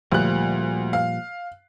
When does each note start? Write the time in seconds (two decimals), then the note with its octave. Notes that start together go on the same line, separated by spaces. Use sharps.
0.12 D2 A#2 F3 G3 F#6
0.93 F5